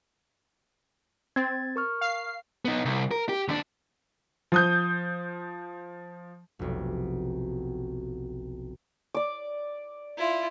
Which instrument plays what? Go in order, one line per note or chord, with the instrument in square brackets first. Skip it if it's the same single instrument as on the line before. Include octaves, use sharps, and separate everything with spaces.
[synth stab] C4 [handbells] G#6 A6
[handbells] A#4 C#6 F6
[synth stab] F5 C7
[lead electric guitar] B3 D#4
C2
A#4
G4
D#2 D4
[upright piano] F3 D#6 G6
[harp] F1 B1
[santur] D5 D6
[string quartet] E4 F4